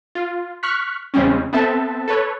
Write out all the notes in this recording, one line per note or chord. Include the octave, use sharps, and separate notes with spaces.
F4
C#6 F6 F#6 B6
E2 C#3 G3 G#3 C4 C#4
B3 C4 A4 E5 A5
A4 B4 C#5